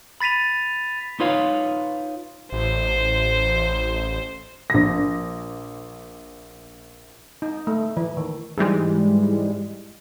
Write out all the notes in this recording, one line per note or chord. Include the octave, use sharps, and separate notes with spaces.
B5 A6 B6 D#7 F7
D#4 F4 B4 C#5 F5
A1 C5
A#1 A#6
D#4
A3
E3
D#3
G#2 E3 G3 G#3